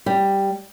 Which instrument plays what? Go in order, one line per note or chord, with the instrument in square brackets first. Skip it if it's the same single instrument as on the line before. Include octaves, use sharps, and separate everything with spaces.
[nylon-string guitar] G3